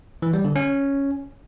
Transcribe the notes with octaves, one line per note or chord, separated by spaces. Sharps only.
E3
G3
D3
C#4